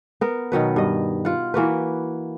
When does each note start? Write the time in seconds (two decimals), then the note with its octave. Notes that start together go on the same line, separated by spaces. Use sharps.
0.21 B3 A#4
0.52 B2 D#3 F#3 B4
0.76 G2 D#5
1.25 F4 F#5
1.54 E3 A#3 F#4 B4